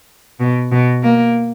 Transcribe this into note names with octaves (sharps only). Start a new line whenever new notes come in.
B2
B2
A#3